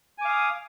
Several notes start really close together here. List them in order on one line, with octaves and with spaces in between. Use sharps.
G#5 D6 F5 D#6